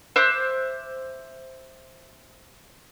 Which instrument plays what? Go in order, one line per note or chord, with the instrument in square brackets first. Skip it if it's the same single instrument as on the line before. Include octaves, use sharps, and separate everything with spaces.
[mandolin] C5 E5 D6 F#6